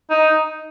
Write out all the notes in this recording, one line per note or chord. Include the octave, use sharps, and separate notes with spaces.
D#4